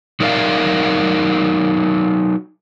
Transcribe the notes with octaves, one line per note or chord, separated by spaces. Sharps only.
F#3 D#4 A#4 D5 E5 F5